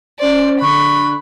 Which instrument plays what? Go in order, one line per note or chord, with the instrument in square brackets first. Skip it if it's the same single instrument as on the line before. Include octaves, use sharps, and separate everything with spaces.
[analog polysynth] C#4 C5 [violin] D5
[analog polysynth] D3 F#6 [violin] B5 [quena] C#6